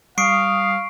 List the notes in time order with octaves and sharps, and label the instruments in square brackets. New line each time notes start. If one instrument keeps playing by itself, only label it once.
[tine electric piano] G3 [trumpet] F5 [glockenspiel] C#6 C7 D7 [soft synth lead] D#6